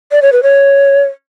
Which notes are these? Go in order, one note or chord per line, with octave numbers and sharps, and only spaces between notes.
D5
C#5
B4
C#5